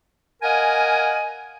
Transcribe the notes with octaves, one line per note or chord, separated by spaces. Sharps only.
A#4 D#5 F5 F#5 G#5